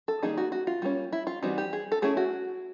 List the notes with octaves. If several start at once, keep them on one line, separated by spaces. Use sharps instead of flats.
A4
D#3 G3 A#3 D#4 G#4
F#4
F#4
F4
G3 A#3 C#4
E4
F4
E3 G3 C4 D#4 F#4
G4
G#4
A4
A3 C#4 E4 G#4
F#4